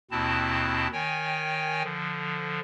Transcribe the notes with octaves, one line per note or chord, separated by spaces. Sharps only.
D#2 B2 C4 E4 A5
D#3 C#5 G5 G#5
D3 F3